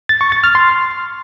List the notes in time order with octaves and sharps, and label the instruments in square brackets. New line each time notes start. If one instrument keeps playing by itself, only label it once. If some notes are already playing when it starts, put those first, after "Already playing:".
[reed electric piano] A6
C#6
A6
F6
C6